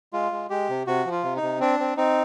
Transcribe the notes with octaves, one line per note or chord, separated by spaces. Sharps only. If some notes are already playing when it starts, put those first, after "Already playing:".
G#3 F4
G#3
G#3 G4
C3
C3 F#4
F3
F4
C3
D#4
C3
C4 D4
C4
C4 D#4